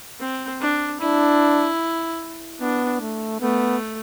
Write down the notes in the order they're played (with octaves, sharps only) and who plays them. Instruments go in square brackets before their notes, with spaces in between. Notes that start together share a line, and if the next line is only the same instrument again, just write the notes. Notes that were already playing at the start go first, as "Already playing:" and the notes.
[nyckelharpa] C4
D4
[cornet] D4 [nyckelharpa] E4
[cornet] B3 [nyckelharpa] D4
[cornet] A3
[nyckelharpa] A3 [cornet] B3